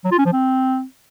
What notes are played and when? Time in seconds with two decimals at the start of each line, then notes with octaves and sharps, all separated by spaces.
0.05 F#3
0.12 F4
0.18 C#4
0.25 F3
0.32 C4